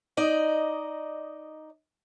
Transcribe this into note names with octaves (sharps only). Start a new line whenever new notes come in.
D#4 D5 D#5